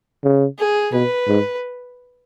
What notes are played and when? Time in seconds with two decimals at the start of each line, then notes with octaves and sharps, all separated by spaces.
0.24 C#3
0.59 G#4
0.93 B2 B4
1.28 G#2